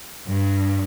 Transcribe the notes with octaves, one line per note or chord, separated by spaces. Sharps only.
G2